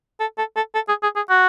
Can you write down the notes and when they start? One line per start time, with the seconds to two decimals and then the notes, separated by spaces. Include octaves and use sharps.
0.20 A4
0.38 A4
0.56 A4
0.75 A4
0.89 G#4
1.03 G#4
1.16 G#4
1.30 F#4